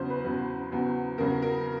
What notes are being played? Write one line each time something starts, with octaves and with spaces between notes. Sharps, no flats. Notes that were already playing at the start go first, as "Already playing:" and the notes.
Already playing: E2 C#3 F#3 C5
B4
E2 C#3 F#3
E2 C#3 F#3
E2 C#3 F#3 A#4
A#4